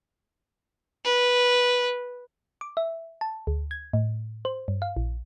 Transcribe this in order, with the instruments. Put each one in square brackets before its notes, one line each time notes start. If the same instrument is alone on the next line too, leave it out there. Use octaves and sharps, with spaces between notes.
[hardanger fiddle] B4
[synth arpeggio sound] D6
E5
A5
D2
G#6
A2
C5
G2
F5
A#1